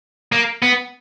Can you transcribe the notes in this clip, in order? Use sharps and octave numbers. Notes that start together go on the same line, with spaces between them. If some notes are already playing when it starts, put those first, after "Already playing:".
A#3
B3